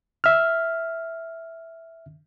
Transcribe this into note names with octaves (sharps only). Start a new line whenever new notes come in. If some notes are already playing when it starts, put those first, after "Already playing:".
E5 F6